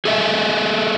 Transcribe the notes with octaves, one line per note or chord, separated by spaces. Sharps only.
G#4 A4 D#5 E5